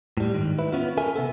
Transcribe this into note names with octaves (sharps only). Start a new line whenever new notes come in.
A2 G3
G#2 D#3
E4 B4
B3 C#4 F4
A4 A#4 E5 G#5
C3 B3 A4